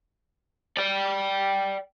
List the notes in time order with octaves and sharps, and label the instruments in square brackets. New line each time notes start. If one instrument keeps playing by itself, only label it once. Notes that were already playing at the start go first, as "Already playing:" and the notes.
[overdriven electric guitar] D5 G5